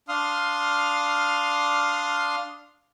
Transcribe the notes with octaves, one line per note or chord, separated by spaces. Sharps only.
D4 F5 C6 D#6 F6